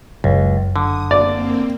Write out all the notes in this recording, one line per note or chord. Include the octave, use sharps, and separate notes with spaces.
F#1 C#2
D3 D#6
A#3 C4 D5